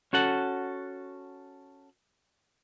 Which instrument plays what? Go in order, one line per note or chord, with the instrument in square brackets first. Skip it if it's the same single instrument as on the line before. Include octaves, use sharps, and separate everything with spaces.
[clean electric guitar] C#4 F#4 A4 F#5